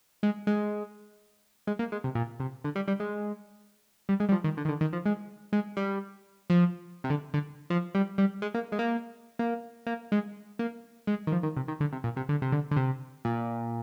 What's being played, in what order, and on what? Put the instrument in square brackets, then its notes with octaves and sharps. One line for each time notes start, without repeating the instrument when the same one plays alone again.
[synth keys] G#3
G#3
G#3
A#3
G#3
C3
A#2
C3
D3
G3
G3
G#3
G3
G#3
G3
F3
D#3
D3
D#3
D3
D#3
F3
G#3
G#3
G3
F3
C3
D3
D3
F3
G3
G3
G#3
A#3
G#3
A#3
A#3
A#3
G#3
A#3
G#3
D#3
F3
D#3
C3
D#3
D3
C3
A#2
C3
D3
C3
D3
D3
C3
A#2